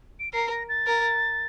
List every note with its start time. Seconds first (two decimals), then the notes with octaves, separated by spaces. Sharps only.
0.20 D7
0.33 A#4 C7
0.51 A#6
0.69 A6
0.87 A#4